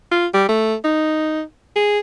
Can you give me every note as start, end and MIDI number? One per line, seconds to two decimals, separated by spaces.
0.12 0.26 65
0.34 0.44 55
0.49 0.75 57
0.85 1.42 63
1.76 1.99 68